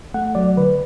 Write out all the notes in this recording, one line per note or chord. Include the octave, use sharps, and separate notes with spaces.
A3 F#5
F#3 D5
D3 B4